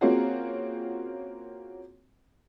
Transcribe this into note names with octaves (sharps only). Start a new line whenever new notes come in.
A#3 C4 C#4 F4 F#4 G#4